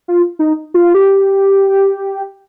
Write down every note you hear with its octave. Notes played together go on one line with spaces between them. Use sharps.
F4
D#4
F4
G4